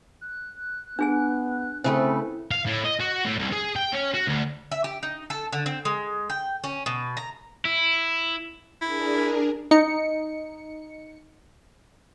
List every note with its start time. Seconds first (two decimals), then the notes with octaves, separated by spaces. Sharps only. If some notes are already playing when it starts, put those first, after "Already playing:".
0.21 F#6
0.99 B3 D4 G#4 G#5
1.84 C#3 A3 C4 E4 A4 B4 C5
2.51 F5
2.66 A2
2.84 D#5
3.00 F#4
3.25 A2
3.39 C2
3.52 G#4
3.76 G5
3.93 C#4
4.15 F#4
4.28 D2
4.72 E5
4.84 G4
5.03 D#4
5.30 A4
5.52 D3
5.66 C4
5.85 G#3
6.30 G5
6.64 C#4
6.86 B2
7.17 A#5
7.65 E4
8.82 D4 E4 G#4 A#4
9.71 D#4 C#7